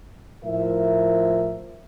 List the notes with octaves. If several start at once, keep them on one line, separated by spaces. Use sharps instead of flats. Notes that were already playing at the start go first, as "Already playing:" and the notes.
A2 F3 A#4 E5